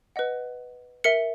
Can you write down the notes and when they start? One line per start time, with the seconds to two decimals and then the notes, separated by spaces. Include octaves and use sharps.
0.16 B4 D#5 F#5
1.04 A#4 E5 C#7